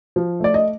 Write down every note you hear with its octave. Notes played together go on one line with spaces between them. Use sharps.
F3
A3 D5
D#5